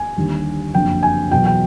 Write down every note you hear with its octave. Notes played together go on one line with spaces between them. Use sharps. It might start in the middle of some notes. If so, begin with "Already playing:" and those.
Already playing: G#5
D#2 D3 G3
F#1 F2 D3 F#3 G5
G#5
E2 B2 F#3 G5
G5